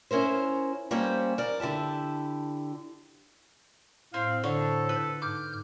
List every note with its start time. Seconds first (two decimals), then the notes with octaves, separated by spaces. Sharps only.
0.11 C#4 E4 A#4 C5
0.91 G3 A#3 C4 C#4 C5
1.38 A#4 D5
1.60 D3 E4 G4 A5
4.14 A2 C4 C5 F5
4.44 D3 A4 C#5
4.89 B4 E6
5.22 G#2 D6 F6 G6